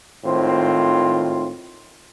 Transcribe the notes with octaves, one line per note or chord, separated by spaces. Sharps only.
G#1 A2 D#3 C4 F4 C5